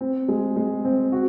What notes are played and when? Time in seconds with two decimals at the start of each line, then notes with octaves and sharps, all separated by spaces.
0.01 C4
0.28 G#3
0.56 G#3
0.85 C4
1.12 F#4